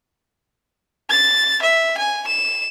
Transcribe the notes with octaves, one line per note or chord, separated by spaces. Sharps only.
A6
E5
G#5
E7